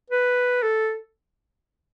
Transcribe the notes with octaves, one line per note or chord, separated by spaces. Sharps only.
B4
A4